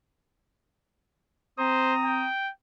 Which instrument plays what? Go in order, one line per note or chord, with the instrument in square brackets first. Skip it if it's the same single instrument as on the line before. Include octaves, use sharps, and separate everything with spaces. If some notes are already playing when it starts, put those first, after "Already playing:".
[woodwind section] C4 A#5 D#6 [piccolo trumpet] C5
[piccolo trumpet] G5